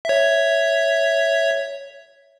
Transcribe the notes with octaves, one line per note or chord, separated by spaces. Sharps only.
C#5 E5